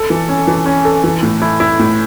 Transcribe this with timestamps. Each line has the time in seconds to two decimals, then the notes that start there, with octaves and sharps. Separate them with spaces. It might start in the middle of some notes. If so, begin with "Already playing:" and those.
Already playing: A4
0.10 E3
0.29 C#4
0.47 E3
0.66 C#4
0.85 A4
1.04 E3
1.23 A2
1.42 E4
1.60 E4
1.79 A2